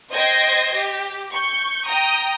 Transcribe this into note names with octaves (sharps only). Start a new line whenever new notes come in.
C5 D#5 G5 G#6 A#6 C7
G4
C#6 G6
G5 A#5 D#6